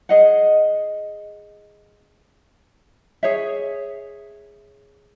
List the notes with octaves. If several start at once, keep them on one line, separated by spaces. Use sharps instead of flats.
G#4 D#5 F#5
G#4 C#5 E5